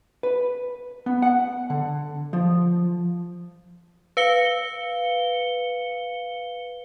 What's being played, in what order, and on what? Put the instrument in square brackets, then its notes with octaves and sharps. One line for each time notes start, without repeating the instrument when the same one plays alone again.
[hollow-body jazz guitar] B4
B3
F#5
D3
F3
[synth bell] B4 F5 C#7 G7